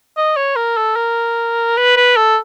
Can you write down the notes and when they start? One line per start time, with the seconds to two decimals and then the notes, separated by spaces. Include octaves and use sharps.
0.17 D#5
0.36 C#5
0.56 A#4
0.77 A4
0.96 A#4
1.77 B4
1.96 B4
2.16 A4